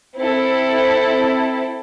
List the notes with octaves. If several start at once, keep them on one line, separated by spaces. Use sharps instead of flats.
C4 E4 A4